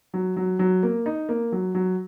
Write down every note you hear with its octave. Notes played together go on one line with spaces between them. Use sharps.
F#3
F#3
F#3
A#3
D#4
A#3
F#3
F#3